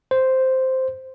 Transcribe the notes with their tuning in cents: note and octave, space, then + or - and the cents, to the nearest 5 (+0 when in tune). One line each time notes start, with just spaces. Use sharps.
C5 -5